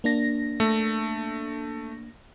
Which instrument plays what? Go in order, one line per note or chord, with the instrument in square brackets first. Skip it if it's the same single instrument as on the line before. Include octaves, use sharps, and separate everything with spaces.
[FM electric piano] A#3 D4 A#6
[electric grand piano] A3